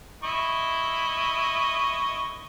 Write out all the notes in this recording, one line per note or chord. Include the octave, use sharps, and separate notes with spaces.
E4 D#5 C#6